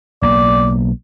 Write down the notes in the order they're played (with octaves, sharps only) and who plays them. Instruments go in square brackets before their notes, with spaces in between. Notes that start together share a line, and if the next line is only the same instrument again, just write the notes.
[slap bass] B1 A#3 [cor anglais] D5